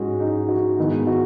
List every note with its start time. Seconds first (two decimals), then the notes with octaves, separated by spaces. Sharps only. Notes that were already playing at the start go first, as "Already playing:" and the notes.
Already playing: G#2 G#3 C#4 F#4 G#4
0.20 D#4
0.49 F#4
0.78 G#2 D#3 G#3 B3 D#4
1.07 F#4